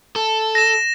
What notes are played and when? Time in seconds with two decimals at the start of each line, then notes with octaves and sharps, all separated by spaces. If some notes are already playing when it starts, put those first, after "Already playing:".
0.16 A4
0.55 A#6 E7